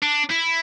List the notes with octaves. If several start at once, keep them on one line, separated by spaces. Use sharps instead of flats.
D4
E4